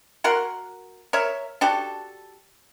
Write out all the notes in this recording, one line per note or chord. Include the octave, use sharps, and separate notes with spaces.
F#4 A#4 F#5 C6
A#4 C#5 E5
D4 F#4 G4 A4